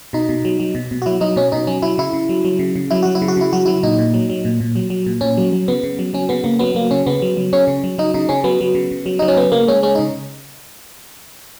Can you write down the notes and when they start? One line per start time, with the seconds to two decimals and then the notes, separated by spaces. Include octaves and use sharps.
0.13 B2 D#4
0.29 B2
0.45 F#3
0.60 F#3
0.75 B2
0.91 B2
1.02 F#4
1.06 F#3 E4
1.21 F#3 D#4
1.36 B2 C#4
1.52 B2 D#4
1.67 F#3 C#4
1.82 F#3 E4
1.98 C#3 E4
2.13 C#3
2.29 F#3
2.45 F#3
2.59 C#3
2.76 C#3
2.91 F#3 E4
3.03 F#3 F#4
3.15 E4
3.22 C#3
3.28 F#4
3.37 C#3 E4
3.53 F#3 F#4
3.66 F#3 E4
3.83 A#2 D#4
3.99 A#2
4.14 F#3
4.30 F#3
4.45 A#2
4.61 A#2
4.76 F#3
4.90 F#3
5.06 A#2
5.21 A#2 C#4
5.37 F#3
5.52 F#3
5.68 C#3 B3
5.83 C#3
5.99 F#3
6.14 F#3 C#4
6.29 C#3 B3
6.44 C#3 A#3
6.59 F#3 B3
6.75 F#3 A#3
6.91 C#3 C#4
7.07 C#3 B3
7.22 F#3
7.37 F#3
7.53 C#3 C#4
7.67 C#3
7.84 F#3
7.98 F#3 D#4
8.14 C#3 D#4
8.29 C#3 C#4
8.44 F#3 B3
8.61 F#3
8.75 C#3
8.91 C#3
9.06 F#3
9.19 F#3 D#4
9.28 C#4
9.37 C#3 B3
9.52 C#3 A#3
9.68 G#3 C#4
9.83 G#3 C#4
9.95 D#4
9.99 C#3